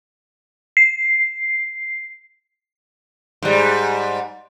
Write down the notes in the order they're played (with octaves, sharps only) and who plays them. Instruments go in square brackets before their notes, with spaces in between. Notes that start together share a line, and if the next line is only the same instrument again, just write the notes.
[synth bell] C7
[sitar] G#2 G3